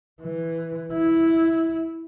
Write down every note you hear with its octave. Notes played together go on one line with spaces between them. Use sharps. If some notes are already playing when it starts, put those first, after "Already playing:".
E3
E4